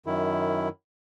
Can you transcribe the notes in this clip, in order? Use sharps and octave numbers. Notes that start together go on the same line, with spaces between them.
F#2 D#3 E4